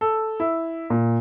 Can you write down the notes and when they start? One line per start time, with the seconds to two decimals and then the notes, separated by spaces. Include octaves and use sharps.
0.01 A4
0.40 E4
0.90 A#2